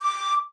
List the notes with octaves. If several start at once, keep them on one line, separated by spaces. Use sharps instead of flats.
D6